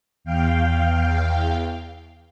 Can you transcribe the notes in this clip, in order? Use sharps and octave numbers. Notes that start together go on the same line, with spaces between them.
E2 F5 G5